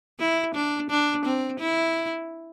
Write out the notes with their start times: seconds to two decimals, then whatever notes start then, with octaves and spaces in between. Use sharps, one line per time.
0.20 E4
0.55 D4
0.90 D4
1.25 C4
1.60 E4